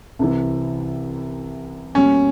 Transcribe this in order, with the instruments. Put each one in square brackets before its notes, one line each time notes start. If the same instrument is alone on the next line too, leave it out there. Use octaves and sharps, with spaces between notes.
[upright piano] C2 C3 E3
[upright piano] E2 B2 G3 A#3 [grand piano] C#4